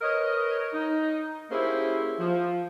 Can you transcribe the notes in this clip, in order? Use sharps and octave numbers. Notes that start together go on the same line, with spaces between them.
A#4 B4 C#5 D#5
D#4
A#3 C#4 E4 G4 G#4 C5
F3